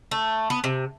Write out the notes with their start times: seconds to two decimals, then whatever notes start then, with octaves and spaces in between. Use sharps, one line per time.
0.11 A3
0.50 B3
0.64 C3